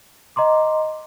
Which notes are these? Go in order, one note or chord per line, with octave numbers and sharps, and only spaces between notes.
D#5 A#5 C6 D6